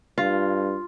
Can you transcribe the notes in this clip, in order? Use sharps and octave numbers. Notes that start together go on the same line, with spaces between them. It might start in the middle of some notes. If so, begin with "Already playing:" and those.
G2 F4